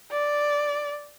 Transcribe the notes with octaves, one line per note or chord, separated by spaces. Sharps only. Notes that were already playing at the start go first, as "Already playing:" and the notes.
D5